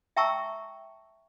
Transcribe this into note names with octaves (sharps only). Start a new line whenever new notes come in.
E5 G5 A5 A#5 C#6 E6